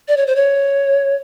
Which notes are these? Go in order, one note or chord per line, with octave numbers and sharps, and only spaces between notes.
D5
C#5
C5
C#5